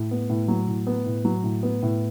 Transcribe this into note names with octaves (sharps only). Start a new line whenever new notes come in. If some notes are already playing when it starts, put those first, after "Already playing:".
Already playing: A2
B3
A2
F#3
A2
B3
A2
F#3
A2
B3
A2